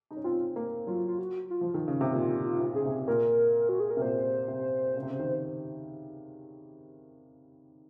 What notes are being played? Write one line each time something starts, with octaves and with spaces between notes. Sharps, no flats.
D#4
C#4
C4 F4
A#3
F#3 F4
F4
F#4
F4
F3
D#3
C#3
C3
A#2 F4
F4
C3
C#3 G#4
C3
A#2 A#4
F#4
G#4
A#4
C3
A#2 C5
C3
C#3
C3
C#3
D#3